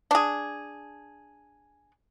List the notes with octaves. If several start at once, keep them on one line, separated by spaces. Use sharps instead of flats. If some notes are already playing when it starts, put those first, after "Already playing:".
D4 G#4